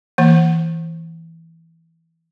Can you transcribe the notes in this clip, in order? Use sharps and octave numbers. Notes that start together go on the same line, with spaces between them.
E3 A#3